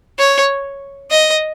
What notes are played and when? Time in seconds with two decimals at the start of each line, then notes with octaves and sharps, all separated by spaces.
0.19 C#5
1.11 D#5